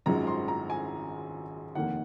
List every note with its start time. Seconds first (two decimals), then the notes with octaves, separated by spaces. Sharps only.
0.06 G#1 F#2 F3 G#3 A#5
0.27 C6
0.48 A#5
0.70 G#5
1.75 F1 D#2 D#3 A#3 F#5